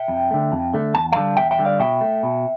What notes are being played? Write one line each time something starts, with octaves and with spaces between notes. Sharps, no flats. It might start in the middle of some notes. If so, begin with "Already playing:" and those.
Already playing: E5 G5
F2
D3 A3
F2
D3 A3
E2 A5
D3 G3 F5 A5
E2 E5 G5
E5 G5
D3 G3
D5 F5
B2 E5 G5
A3
B2